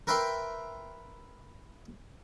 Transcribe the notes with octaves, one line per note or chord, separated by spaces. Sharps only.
A#4 B4 E5 G5 C6